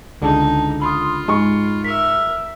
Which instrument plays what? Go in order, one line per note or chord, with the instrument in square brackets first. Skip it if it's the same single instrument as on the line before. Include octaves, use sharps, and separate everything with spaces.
[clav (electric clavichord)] C#2 D3 [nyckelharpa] D#4 [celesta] G#4 A5
[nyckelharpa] F4 [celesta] B5 C6 D#6
[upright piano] G#2 C#6 [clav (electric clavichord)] G#3 [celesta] B5
[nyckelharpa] A#4 E5 [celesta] B6